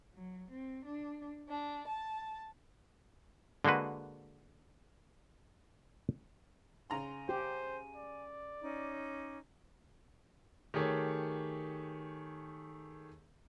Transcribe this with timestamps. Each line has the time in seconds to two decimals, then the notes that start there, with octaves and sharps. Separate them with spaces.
0.15 F#3
0.51 C4
0.86 D4
1.50 D4
1.87 A5
3.65 D3 G#3 A#3 F#4 B4
6.90 C#3 G#5 A#5 C6
7.29 G4 C5
7.96 D5
8.62 C#4 D#4 D6
10.74 D#3 A3 G4 G#4 C#5